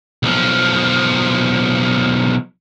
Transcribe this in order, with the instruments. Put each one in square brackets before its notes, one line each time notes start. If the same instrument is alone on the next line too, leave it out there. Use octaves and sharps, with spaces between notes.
[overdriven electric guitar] B1 F3